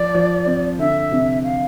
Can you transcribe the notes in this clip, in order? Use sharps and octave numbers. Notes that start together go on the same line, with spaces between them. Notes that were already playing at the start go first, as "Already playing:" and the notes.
Already playing: F3 D5
F3
C4
D3 E5
C3
F5